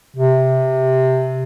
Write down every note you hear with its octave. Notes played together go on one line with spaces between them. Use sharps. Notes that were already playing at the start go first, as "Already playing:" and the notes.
C3